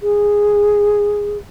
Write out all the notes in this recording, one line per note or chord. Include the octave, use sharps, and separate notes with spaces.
G#4